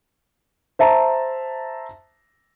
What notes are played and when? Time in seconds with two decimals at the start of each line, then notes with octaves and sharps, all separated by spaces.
0.79 C5 E5 A5 A#5